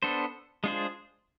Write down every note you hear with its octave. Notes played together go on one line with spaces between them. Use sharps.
B3 D4 A4 C5
G#3 D4 F4 G#4 C5